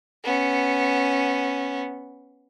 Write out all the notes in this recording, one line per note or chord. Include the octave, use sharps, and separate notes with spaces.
B3 C#4